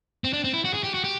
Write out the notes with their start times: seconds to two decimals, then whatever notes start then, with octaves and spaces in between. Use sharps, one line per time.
0.24 C4
0.33 D4
0.44 C4
0.53 E4
0.65 F#4
0.74 G#4
0.84 G4
0.94 F#4
1.04 G4